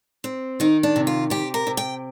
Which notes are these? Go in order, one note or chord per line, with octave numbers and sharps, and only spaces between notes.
C4
D#3 D#4
D4
C3
F4
C3 G4
A#4
C3
G5